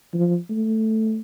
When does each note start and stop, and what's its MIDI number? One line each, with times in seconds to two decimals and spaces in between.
0.14 0.37 53
0.50 1.21 57